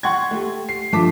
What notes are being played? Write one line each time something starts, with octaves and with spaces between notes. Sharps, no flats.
F#5 C6 C#6 G#6
A3 G4
C7
G2 F3 A3 A5 D6 B6